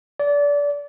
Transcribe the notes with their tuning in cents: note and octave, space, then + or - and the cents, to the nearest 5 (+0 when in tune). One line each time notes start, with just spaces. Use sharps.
D5 -25